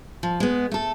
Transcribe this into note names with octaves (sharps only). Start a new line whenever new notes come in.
F3
G#3 B3
A3 A4